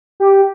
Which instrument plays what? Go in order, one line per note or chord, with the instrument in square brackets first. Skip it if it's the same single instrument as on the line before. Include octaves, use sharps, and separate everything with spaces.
[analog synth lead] G4